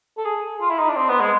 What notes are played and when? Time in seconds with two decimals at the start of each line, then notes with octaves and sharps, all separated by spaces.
0.17 A4
0.25 G#4
0.61 F4
0.70 E4
0.79 D#4
0.88 D4
0.96 C4
1.09 B3
1.20 G#3